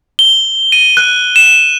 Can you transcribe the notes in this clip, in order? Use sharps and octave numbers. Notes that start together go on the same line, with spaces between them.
G7
D#7
F#6
E7